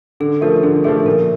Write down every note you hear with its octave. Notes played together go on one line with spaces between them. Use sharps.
D3 A4
F3 A3 A#4
D3 G#4
F3 A3 A4
A#2 A#4